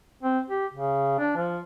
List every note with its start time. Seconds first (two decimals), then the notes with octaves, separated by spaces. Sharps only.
0.23 C4
0.50 G4
0.73 C#3
1.19 D4
1.36 F3